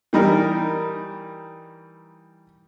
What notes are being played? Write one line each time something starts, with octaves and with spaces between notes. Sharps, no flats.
E3 G3 D#4 A#4